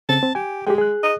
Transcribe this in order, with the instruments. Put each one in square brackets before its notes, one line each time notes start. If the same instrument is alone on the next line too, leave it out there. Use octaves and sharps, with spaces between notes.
[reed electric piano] C#3 C4 [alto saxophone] A5
[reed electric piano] C4
[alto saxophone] G4 [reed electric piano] G#5
[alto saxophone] G#3 [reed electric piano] G4 G#4 G5
[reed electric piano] G#4 F#6
[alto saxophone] D#5